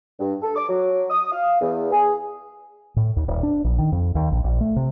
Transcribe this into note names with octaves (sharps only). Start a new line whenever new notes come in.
G2
A4
D6
F#3
D#6
F5
E2
G#4
A2
D#2
D#1
D4
A#1
D#3
F2
D#2
A#1
A#1
A3
C3